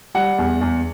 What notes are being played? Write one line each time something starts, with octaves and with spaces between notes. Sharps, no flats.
G3 F#5
E2
E2